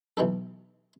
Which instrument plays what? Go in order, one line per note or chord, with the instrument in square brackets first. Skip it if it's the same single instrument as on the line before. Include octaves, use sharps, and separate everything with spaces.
[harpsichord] B1 E3 D#4 A4